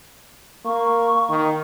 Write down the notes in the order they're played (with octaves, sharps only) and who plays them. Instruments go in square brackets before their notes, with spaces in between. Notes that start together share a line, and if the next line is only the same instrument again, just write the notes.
[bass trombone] A#3 [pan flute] C#6
[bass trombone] D#3